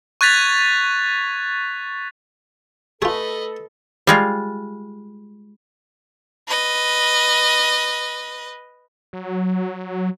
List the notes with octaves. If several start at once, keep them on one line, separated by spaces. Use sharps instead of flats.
C#6 F#6 G#6 A6 B6 F7
A3 F4 G#4 A4 B4 D#5
G3 G#3 F4
B4 D#5
F#3